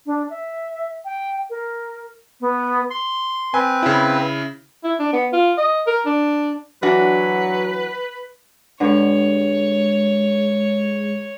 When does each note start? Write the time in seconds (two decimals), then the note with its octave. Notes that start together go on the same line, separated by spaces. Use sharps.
0.06 D4
0.30 E5
1.05 G5
1.50 A#4
2.41 B3
2.90 C6
3.54 C4 B4 G#5
3.83 C#3 E4
4.84 E4
4.99 D4
5.13 B3
5.33 F4
5.58 D#5
5.87 A#4
6.06 D4
6.83 E3 F#3 D4 F#4 B4
8.80 G2 D3 G#3 C#5